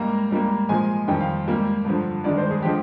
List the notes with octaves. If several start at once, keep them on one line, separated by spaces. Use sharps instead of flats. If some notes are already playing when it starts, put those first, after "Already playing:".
Already playing: G#2 G3 A#3 A#5
G#2 G3 A#3
A#2 F3 G#3 G#5
F2 D#3 G3 G5
F5
G#2 G3 A#3
G2 D3 F3
G2 D#3 G#3 D5
C5
G#4
D3 F3 G#3 G4